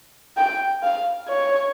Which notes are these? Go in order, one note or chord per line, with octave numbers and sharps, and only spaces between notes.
G5
F5
C#5